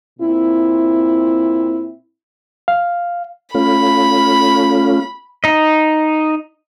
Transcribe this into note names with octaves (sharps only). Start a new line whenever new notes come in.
A#2 C4 E4
F5
A3 C#4 F4 B5
D#4 D#5